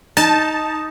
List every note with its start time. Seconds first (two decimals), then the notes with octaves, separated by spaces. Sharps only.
0.17 D#4 A5